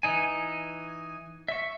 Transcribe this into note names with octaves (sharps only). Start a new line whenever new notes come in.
E3 D#4 G#5
E5 C#6